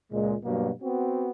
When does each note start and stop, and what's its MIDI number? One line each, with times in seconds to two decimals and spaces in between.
0.11 0.35 37
0.11 0.35 46
0.11 0.35 56
0.43 0.70 43
0.43 0.70 47
0.43 0.70 54
0.43 0.70 58
0.82 1.31 59
0.82 1.31 60
0.82 1.31 66